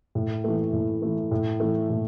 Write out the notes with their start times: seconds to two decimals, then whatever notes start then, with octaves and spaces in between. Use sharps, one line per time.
0.15 A2
0.44 E3 A3
0.73 A2
1.02 E3 A3
1.31 A2
1.60 E3 A3
1.90 A2